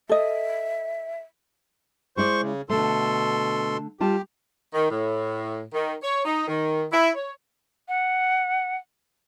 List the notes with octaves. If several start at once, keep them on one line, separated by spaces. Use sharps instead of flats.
A4 D#5 E5
G#3 E4 C5 D5 C#6
C#3
B2 D3 A3 A4 C6
G3 F4 G4 A5
D#3
A2
D#3
C#5
D#4
D#3
E4
C#5
F#5